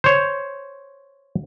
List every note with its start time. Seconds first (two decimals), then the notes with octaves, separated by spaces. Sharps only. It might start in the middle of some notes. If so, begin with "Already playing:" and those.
0.04 C5 C#5